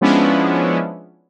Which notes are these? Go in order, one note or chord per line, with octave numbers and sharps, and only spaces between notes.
F3 G#3 B3 C#4 D4 E4